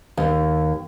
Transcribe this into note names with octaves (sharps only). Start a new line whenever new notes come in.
D#2